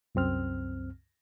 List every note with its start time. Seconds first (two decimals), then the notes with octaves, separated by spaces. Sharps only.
0.15 C2 F#2 C4 F6